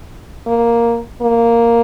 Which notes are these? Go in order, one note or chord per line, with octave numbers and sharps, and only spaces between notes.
A#3
A#3